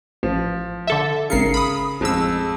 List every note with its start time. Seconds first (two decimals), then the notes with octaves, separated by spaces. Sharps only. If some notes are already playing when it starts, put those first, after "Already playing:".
0.23 A1 F3
0.87 D3 A4 E5
1.30 G#1 C#3 A#4 C7 C#7
1.54 B5 D#6
2.01 A1 F2 G#3 E6